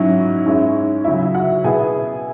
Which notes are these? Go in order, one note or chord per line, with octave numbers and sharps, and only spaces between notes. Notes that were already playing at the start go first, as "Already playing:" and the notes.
Already playing: G#2 F#3 C#4 E4
G#2 G#3 C#4 E4
C#3 F#3 E4 E5
F#4 F#5
B2 B3 E4 G#4 G#5